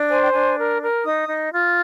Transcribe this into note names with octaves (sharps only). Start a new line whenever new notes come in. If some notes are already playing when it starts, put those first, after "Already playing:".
Already playing: D4
C5 G#5
G5
D4 G#5
A#4
A#4
D#4 D#6
D#4
F4